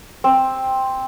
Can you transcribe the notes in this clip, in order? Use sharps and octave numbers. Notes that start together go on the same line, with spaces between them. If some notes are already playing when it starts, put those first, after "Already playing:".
C4